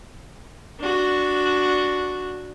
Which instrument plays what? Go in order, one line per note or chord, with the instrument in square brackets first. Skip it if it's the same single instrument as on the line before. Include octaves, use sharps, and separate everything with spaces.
[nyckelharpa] D4 F#4